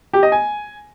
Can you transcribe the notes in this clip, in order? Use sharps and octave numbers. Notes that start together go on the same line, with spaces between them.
G4
D#5
G#5